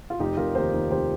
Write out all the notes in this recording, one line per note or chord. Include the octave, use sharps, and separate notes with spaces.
F4
F1 D#4 G4
F1 F4 A#4
D#2 G4 C5
D#2
F1 G4 C5